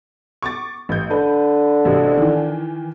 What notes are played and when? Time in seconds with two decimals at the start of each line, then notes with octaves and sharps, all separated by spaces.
0.42 C#6 D6 A6
0.89 A1 G6
1.11 D3 B4
1.85 A1 C3 F#4
2.18 D#3 E3